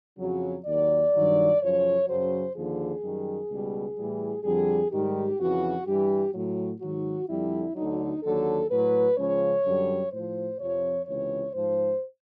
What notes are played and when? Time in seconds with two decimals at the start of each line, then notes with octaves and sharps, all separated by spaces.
0.18 F2 C#3 F#3
0.65 D#2 D#3 F#3 D5
1.12 G2 D#3 F#3
1.60 F#2 C#3 F3 C#5
2.07 F#2 C#3 F#3 C5
2.54 D#2 D3 F3 G#4
3.02 F#2 D#3 G3
3.49 C#2 B2 G3
3.96 A2 E3 G3
4.44 F2 D3 G3 G#4
4.91 G#2 D#3 G3 G4
5.39 F2 C#3 E3 F#4
5.86 G2 E3 G3 G4
6.33 A2 F#3
6.80 G#2 D#3 F#3 F#4
7.27 F2 D3 G3 E4
7.75 D2 D3 F#3 D#4
8.22 D#2 D3 F#3 A4
8.70 A2 F#3 B4
9.17 C#2 C#3 F3 C#5
9.64 F#2 D3 G3
10.11 A2 F3 C5
10.59 F2 C3 F3 C#5
11.06 C#2 C3 E3 C#5
11.54 G#2 F3 C5